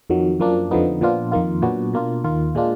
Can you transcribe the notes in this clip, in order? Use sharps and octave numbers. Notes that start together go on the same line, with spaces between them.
F2 D#3 F#3
F#2 F3 A#3 D4
F2 D3 F3 B3 D#4
A#2 F3 B3 D4 F4
F2 D#3 A#3 F4
A#2 F#3 B3 D4 F#4
B2 A#3 D4 F4
D#2 D#3 A#3 F4
A#2 G#3 D4 F4